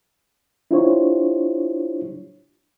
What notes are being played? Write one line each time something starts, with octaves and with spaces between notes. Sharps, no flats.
D4 E4 F4 G4 C5 C#5